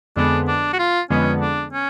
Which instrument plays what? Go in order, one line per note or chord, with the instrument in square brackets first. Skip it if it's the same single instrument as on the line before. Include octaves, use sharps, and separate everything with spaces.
[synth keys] F2 D3 G#3 B3 [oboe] D4
[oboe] D4
F#4
F4
[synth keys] F2 D3 G#3 B3 [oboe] C#4
[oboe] D4
C#4